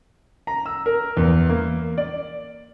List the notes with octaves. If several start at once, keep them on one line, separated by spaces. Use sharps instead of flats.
A#5
E6
A#4
E2
A#3
D5